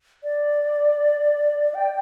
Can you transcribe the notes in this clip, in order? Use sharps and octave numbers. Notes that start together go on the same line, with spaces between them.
D5
G5